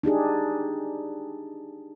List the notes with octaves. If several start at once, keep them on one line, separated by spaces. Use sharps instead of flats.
D4 D#4 G4 G#4